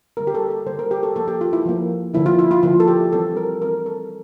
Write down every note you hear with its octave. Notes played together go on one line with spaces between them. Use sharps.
D3 G3 A#3 A#4
G4
A4
A4
D3 G3 A#3 C5
A#4
G4
A4
F3 A#3 A4
G4
F4
E4
F3 A#3
D3 F3 A#3 E4
F4
E4
F4
D3 F3 A#3 F4
A4
G4
E3 G3 C4 A4
A#4
E3 G3 C4 A#4
A4